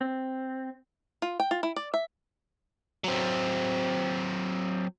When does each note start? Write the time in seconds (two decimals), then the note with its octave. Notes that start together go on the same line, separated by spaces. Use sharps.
0.01 C4
1.22 F4
1.40 G5
1.51 F4
1.63 E4
1.76 D5
1.94 E5
3.04 F#3 C4